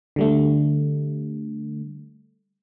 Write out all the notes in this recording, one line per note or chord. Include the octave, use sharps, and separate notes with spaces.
D3 G3 A3